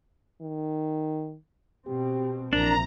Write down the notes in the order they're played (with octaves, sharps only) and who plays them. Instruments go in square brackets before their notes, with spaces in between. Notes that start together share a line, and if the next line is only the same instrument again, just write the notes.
[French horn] D#3
[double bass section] B2 C4 [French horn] G4
[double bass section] A#1 C3 E3 [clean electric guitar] D4 [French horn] A#4 [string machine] A#5